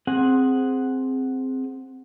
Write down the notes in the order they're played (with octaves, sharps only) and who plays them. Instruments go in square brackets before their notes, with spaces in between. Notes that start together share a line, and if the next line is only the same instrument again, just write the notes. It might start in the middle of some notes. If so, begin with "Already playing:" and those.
[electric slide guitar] C4 G#4 F#5